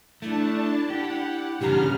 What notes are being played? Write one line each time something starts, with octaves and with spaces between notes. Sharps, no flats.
A3 D4 E4 A5
G4 F#5
G2 A#2 C#3 E3 D4 G4 A#5 F6